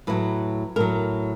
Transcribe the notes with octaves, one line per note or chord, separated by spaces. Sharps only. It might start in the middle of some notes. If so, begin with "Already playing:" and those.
A2 F#3 B4
A2 F#3 A#4